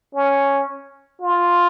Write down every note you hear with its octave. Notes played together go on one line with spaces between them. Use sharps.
C#4
F4